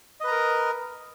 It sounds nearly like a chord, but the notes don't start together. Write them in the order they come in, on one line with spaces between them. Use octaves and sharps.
D#5 B4 A#5 A#4